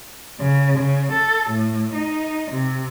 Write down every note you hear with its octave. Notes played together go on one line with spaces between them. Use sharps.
C#3
C#3
A4
A2
D#4
C3